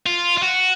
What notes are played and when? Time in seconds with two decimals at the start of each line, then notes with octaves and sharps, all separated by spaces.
0.06 F4
0.37 F4
0.42 F#4